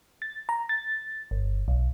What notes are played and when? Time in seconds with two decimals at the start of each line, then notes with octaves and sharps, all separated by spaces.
0.22 A6
0.49 A#5
0.69 A6
1.31 G1
1.68 B1